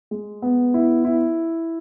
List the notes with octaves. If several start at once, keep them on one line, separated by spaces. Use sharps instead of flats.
G#3
B3
E4
E4